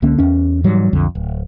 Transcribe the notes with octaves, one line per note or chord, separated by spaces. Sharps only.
C#2 D3 A#3 C#4
E2 C#4
G#2 E3 F#3 G3
B1 F2 D3
D1